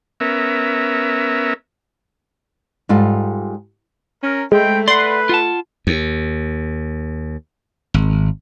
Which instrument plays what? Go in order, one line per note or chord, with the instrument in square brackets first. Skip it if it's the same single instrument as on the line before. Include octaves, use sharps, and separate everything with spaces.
[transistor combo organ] B3 C#4 A#4 E5
[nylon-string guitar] G#2 G3 F4 A4
[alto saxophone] C#4 [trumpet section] A#4
[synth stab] G#3 [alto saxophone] A3 [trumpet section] C4 E4 G5
[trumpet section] B4 [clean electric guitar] D5 F#5 [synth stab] C6
[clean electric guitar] F4 F#5 A5
[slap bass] D#2
G#1